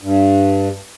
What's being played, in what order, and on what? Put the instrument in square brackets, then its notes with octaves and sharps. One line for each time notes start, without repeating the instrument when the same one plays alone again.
[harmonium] G2